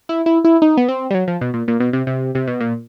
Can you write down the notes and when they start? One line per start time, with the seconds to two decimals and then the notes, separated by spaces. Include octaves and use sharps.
0.09 E4
0.26 E4
0.45 E4
0.62 D#4
0.77 B3
0.89 C4
1.11 G3
1.15 F#3
1.28 F3
1.41 B2
1.54 A#2
1.68 A#2
1.80 B2
1.93 C3
2.07 C3
2.35 C3
2.47 B2
2.61 A#2